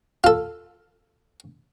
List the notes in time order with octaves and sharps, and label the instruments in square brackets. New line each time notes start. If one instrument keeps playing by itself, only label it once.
[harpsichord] F4 A4